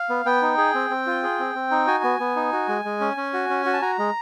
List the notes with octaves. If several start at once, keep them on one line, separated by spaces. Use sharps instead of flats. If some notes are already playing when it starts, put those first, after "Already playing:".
Already playing: F5
B3
B3 G5
D#4
G#4
C4
C4
F4
G#4
C4
C4
D#4
F#4 G#5
B3
B3
D#4
F#4
G#3
G#3
C#4
C#4
F#4
C#4
F#4
A5
F#4 A#5
G#3